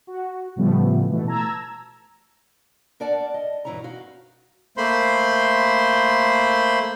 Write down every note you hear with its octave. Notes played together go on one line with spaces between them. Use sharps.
F#4
A2 C#3 F3 G3 A3 B3
B2 E3 A3
A5 A#5 E6 G#6
D4 A#4 D5 F#5 A5
D#5
G2 B2 E3 E4 C#5 A#5
D#4 F#4 F5
A3 A#3 C5 B5 C6